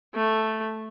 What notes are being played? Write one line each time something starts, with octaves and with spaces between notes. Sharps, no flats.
A3